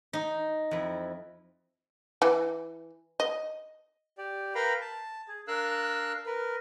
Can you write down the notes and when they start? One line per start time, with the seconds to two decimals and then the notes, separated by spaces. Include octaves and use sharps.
0.13 D#4
0.71 F2 E4
2.22 E3
3.20 D#5
4.18 G4 D5
4.55 A#4 B4 F5 G5 A#5 B5
4.81 A5
5.28 G#4
5.48 D4 A#4 F5 E6 F#6
6.26 A#4 B4